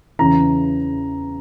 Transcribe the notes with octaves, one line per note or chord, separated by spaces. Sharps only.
E2 C#3 E3 A#5